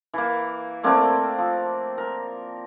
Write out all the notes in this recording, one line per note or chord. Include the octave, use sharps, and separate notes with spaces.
E3 A#3
A3 A#3 C4 D4
F3
A#4